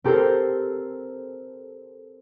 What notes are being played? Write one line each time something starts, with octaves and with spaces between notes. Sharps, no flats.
C4 G4 A4 A#4 C5